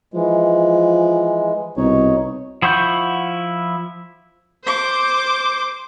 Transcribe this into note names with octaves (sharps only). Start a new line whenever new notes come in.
E3 F3 G#3
C2 B2 D#4 C#5
F3 E4 F#5 C#6 G6
C5 D6